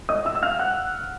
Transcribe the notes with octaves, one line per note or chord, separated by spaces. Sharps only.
D#5 D#6
E5 E6
E6
F5 F6
F#5 F#6